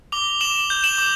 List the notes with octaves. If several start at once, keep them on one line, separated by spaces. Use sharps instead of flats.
D6 F7 G7
D6 E7 F#7
G6
E7 F#7
D6